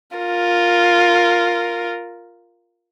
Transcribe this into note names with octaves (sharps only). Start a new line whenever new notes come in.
F4 A#4